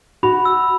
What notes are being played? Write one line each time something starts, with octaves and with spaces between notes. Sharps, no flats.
F#4 B5
E6